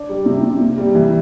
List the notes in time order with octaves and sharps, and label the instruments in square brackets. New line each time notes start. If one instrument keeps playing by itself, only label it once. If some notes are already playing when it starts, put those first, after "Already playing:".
Already playing: [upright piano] D4
G3
C3
C3
A#3
G3
E3